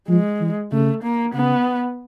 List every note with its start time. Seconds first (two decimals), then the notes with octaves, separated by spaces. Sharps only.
0.09 F3 G#3
0.41 E3
0.72 C#3 A3
1.03 A#3
1.34 C#3 B3